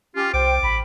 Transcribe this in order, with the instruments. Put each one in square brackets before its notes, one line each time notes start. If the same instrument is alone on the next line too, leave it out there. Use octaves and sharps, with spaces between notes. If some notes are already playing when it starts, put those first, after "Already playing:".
[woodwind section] C#4 G4 [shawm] F4
[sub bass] C2 [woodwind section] C5 G5 [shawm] D6
[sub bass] A1 [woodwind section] B5